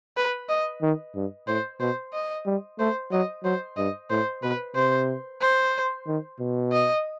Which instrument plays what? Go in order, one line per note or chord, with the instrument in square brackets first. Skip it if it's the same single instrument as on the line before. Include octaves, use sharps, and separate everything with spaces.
[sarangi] B4
D#5
[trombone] D#3
G2
[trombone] A2 [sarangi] C5
[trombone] B2 [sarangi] C5
[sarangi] D#5
[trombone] G3
[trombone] A3 [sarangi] C5
[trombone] F#3 [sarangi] D#5
[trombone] F#3 [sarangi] C5
[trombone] G2 [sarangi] D#5
[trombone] A2 [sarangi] C5
[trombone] B2 [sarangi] B4
[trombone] C3 [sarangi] C5
[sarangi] C5
[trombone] D#3
B2
[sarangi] D#5